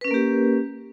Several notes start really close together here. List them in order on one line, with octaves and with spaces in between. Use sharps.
B4 C#4 A#4 A#3 G4